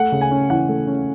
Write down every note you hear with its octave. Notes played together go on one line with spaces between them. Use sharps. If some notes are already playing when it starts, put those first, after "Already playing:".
Already playing: A3 F#5
C#3
G#5
C#4
E3 F#5
A3
C#4